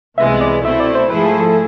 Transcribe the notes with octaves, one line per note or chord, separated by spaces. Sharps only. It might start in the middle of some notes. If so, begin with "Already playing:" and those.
C2 C3 E3 G#3 B3 E5
D5
B2 A3 C4 E4 E5
D5
C5
G#2 F3 A3 E4 G#4 B4
A4
A4